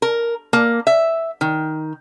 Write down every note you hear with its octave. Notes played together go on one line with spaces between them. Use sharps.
A#4
A#3
E5
D#3